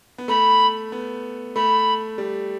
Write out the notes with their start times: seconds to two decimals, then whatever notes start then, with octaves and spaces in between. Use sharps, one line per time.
0.18 B3
0.28 A3 B5
0.92 B3
1.55 A3 B5
2.18 G3